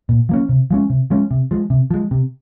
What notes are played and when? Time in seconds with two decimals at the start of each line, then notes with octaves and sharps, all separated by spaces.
0.09 A#2
0.29 F3 A#3 C#4
0.49 C3
0.71 F3 G#3 C#4
0.90 C3
1.10 F3 G#3 C#4
1.31 C3
1.51 F3 G#3
1.70 C3
1.91 F3 G#3
2.11 C3